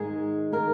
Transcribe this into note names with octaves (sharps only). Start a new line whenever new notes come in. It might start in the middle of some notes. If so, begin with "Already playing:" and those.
Already playing: G#2 D#3 G#3 G#4
D#3 A#3 A#4